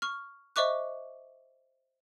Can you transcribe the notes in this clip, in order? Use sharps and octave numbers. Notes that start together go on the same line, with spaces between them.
C#6 F6
C5 D#5 E5 C#6 D6 F#6